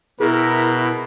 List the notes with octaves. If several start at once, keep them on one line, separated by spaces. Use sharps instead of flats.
B2 E4 G#4 A#4